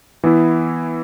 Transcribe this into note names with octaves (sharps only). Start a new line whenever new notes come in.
E3 B3 E4